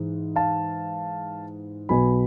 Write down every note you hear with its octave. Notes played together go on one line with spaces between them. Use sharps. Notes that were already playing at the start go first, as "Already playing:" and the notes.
Already playing: G#2 E3
F5 A5
B1 B2 B3 G#5 B5